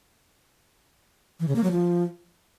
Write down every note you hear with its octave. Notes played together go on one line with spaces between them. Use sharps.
E3
C#3
A#3
F#3
F3